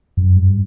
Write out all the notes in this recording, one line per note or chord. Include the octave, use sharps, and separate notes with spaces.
F#2
G2